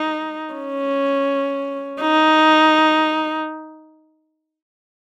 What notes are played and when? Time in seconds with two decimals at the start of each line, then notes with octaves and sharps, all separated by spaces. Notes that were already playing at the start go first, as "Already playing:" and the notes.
Already playing: D#4
0.55 C#4
2.01 D#4